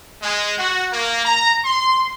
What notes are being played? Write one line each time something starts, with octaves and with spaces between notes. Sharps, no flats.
G#3
F#4
A#3
A#5
C6